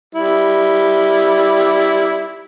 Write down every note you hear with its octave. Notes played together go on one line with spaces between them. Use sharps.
G3 E4